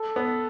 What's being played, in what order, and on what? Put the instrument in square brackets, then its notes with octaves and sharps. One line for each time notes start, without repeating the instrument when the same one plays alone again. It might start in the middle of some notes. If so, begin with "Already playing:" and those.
Already playing: [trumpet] A4
[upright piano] B3